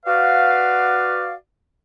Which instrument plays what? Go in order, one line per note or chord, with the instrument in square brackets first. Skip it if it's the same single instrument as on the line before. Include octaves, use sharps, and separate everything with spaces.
[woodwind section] F#4 B4 D5 F5